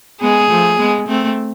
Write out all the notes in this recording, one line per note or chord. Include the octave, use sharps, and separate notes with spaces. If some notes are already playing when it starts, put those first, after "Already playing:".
G#3 B3 G#4
F3 A3
G#3 B3
A3 C4